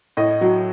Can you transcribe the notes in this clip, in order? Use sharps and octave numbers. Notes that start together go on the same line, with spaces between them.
A2 D#5
F#3